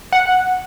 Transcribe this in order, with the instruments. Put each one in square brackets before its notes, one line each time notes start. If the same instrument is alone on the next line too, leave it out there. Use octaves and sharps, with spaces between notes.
[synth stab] F#5